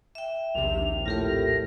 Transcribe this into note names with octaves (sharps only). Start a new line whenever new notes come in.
E5 G5
A#1 D#2 C3 F7
A2 F4 G4 A#4 A#6